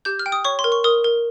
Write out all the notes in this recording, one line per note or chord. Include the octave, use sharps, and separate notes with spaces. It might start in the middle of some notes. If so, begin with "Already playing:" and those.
G4 G6
F6
G5
D#6
C#5 C#6
C6
A#4
C#6
A#4 D#6
A#4